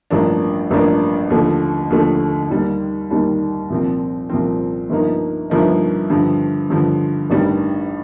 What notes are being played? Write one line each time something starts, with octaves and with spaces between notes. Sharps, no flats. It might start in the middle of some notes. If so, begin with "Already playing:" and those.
A1 G2 F3 A#3 D4
A1 G2 F3 A#3 D4
D#2 D3 F3 A3
D#2 D3 F3 A3
D#2 D#3 G3
D#2 D#3 G3
C2 A#2 F3 C4
C2 A#2 F3 C4
G1 G2 F3 A#3 D#4
G1 G2 F3 A#3 D#4
G2 D3 F3
G2 D3 F3
A1 G2 D#3 G3 D4